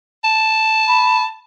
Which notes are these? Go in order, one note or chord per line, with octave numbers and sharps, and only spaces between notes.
A5
B5